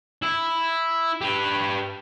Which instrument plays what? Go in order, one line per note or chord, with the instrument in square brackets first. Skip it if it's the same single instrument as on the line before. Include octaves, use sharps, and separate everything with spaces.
[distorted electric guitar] E4
G4 B4